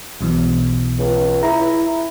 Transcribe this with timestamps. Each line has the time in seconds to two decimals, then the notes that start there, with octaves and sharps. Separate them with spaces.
0.21 B1 B2 E3
0.99 C#2
1.43 E4 A#5